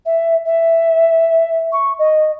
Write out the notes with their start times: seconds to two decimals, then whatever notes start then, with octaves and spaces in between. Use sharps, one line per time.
0.05 E5
0.45 E5
1.72 C#6
1.98 D#5